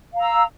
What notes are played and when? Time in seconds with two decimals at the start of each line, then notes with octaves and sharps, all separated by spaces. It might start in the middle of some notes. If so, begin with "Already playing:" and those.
0.13 F5
0.17 A#5
0.21 E6